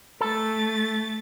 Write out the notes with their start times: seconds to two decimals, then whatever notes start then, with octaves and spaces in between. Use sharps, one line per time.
0.21 A3 A4 A6